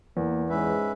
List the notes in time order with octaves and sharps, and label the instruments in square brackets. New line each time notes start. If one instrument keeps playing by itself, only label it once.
[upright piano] E2 [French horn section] A#3
[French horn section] G#2 G#3 [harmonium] C#4 B4 E5